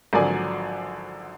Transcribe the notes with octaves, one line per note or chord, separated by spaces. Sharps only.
G#1 D3 F3 F#3 D5 G#5